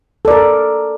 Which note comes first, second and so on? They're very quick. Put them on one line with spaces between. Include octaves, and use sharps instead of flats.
A4 D5 A#4